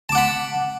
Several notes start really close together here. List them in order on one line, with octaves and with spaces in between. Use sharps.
A5 D6 F#5 B5